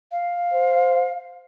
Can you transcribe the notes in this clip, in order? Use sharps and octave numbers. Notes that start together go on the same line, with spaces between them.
F5
C5